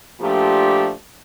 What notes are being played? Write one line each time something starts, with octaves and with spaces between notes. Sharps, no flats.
A#2 F3 A3 D4 G4